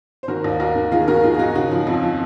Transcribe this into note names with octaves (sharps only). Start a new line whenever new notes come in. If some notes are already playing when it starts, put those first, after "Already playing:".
C5
D#3 F#4 A#4
D#2
D#2 F#4 A#4
D#3
D#3 F4 G#4
D#3 F#4 A#4
D#3 F4 G#4
G#4
D#3 D#4 F#4
C#3 D#4 F#4
F3
F2
F3